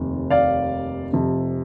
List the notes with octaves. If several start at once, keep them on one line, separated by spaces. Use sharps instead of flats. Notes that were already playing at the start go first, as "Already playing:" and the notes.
Already playing: F1 D#2 D#3
D5 F5
F1 F2 C3